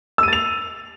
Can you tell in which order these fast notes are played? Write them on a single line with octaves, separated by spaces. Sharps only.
E6 D#7 A6 F7